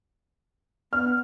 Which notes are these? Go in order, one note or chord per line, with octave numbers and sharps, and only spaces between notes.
B3 F6